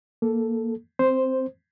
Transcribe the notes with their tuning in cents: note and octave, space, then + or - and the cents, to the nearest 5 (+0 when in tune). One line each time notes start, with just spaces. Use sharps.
A#3 -5 A4 +0
C4 +0 C5 +0